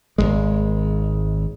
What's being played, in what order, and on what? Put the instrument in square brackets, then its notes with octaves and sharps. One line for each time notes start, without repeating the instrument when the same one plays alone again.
[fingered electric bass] G#1 D#2 G#3